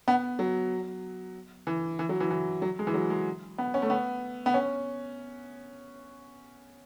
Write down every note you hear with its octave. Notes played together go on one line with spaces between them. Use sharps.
B3
F#3
E3
E3
F#3
E3
E3
F#3
G#3
E3
F#3
G#3
B3
C#4
A3
B3
B3
C#4